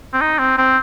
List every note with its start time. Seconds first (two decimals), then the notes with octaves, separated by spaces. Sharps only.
0.13 C4
0.21 D#4
0.39 C4
0.58 C4